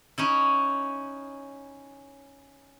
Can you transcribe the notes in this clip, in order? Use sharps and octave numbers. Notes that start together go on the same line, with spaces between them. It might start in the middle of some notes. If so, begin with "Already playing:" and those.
C#4 D#4 E4